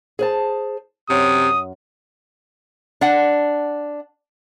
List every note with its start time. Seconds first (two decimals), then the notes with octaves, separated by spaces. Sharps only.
0.19 G#4 C5 A5
1.10 F#2 C3 D#6
3.01 D4 F#5